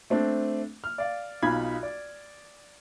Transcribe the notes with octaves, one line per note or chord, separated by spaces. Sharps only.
A3 C4 D4
F6
D5 F5
B1 D#4 F4 B5 G#6
D5